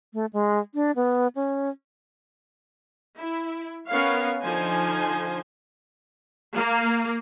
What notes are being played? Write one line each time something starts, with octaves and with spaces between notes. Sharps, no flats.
A3
G#3
D4
B3
C#4
E4
B3 C#4 A#4 C#5 F5
D3 F3 D#4 C5 G#5
A#3